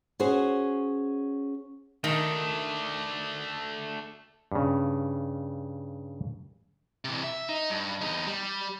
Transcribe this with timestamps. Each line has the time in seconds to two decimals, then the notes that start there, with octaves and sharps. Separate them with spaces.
0.20 C#4 F#4 G#4 C5
2.04 D#3 A3 D4
4.52 G2 C#3
7.05 C3 E3
7.23 E5
7.49 D#4
7.70 G2
8.01 E2 D#4
8.27 G3